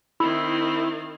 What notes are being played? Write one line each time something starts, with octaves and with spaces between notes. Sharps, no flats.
D#3 C4 E4